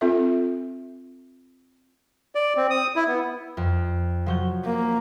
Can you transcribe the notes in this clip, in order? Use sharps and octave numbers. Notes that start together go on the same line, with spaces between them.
C4 F4 A4 E5
D5
C4
D#6
E4
B3
F2
F3 F#3 G6
A#3